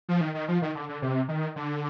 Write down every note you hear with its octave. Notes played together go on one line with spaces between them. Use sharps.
F3
D#3
D#3
F3
D#3
D3
D3
C3
D#3
D3